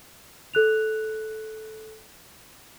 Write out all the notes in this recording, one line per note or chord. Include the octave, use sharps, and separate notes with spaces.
A4 F#6 F7